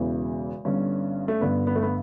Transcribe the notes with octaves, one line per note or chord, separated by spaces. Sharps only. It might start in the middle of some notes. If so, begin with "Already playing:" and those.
Already playing: E1 E2 C#3 E3
G1 G2 D3 C#4
A3
G1 G2 D3 B3
B3
A3
B3